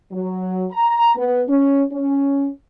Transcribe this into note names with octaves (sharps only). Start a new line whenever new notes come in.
F#3
A#5
B3
C#4
C#4